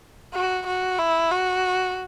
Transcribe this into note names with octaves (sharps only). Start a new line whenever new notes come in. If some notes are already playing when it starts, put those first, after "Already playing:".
F#4
F#4
E4
F#4